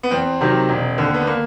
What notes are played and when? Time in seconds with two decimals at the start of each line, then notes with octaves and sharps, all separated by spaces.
0.03 B3
0.11 E2 C4
0.41 C3 D#3 F#3
0.69 E1
0.98 D#2 D3
1.14 B3
1.27 A#3